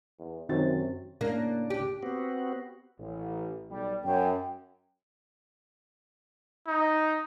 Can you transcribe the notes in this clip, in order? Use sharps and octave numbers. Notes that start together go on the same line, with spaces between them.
E2
F#2 C3 D#3 C4 D#4 F#4 A6
A2 C#3 A#3 D4
G4
B3 C4 F#4
A1
B1 G3
F#2 G5
D#4